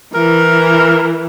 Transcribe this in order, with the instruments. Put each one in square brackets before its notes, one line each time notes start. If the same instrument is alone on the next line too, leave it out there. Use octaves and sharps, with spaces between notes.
[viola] E3 [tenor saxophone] A#4